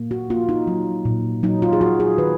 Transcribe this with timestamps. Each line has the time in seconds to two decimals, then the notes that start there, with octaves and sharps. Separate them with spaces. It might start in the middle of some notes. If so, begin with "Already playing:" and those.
Already playing: A#2 A#3
0.11 F#4
0.30 A#3 F4
0.49 D#4
0.67 F#3
1.05 A#2
1.43 F#3 D#4
1.62 F4
1.73 G#4
1.81 F#3 F#4
2.00 G#4
2.18 D#3 B4